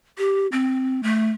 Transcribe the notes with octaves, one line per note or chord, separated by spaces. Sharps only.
G4
C4
A3